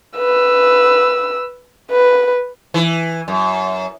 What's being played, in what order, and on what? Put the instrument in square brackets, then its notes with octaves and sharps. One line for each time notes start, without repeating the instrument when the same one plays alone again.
[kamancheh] B4 E6
B4
[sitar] E3
F#2